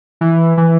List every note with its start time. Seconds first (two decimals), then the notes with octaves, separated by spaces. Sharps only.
0.21 E3
0.57 E3